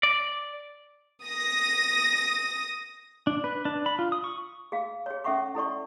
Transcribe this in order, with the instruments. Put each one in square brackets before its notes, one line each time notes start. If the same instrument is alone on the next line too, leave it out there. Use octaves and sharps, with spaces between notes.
[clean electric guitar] D5
[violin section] D#6 A#6
[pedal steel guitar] D4
B4
D4
B5
F4
D#6
C#6
[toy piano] G#4 F5
G#4 C#5
C#4 A4 E5 F#5 C#6 D6
E4 A4 D5 C#6